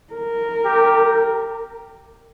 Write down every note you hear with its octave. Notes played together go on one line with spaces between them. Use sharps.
A#4
G4